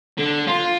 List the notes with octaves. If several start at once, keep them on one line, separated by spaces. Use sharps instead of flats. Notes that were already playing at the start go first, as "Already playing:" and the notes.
D3
F4